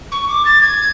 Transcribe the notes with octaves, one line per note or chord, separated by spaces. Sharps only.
C#6
D6
A6
G#6